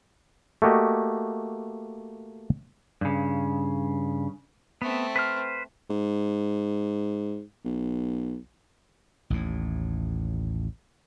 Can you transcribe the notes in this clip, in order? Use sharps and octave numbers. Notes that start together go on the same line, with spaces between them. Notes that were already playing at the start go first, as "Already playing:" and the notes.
A3 A#3 F#4 G4 D#5
G2 C#3
A3 B3 C4
B4 C5 F6
G#2
B1
A1 D#2 A2